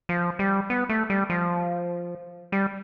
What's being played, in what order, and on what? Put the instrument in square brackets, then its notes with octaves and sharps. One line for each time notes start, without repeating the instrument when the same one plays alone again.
[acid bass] F3
G3
B3
A3
G3
F3
G3